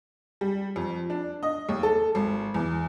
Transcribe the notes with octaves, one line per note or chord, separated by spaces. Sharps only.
G3
F2
D4
D#5
D#2
A4
G#1
E2